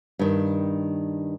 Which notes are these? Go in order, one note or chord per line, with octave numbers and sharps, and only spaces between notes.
G2 D#3